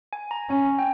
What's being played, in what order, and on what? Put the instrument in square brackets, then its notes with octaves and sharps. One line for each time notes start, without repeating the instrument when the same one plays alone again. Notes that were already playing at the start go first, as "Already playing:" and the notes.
[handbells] G#5
A#5
[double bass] C#4 [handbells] G#5
[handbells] G5